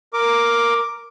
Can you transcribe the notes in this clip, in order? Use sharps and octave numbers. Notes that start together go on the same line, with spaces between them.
A#4 D6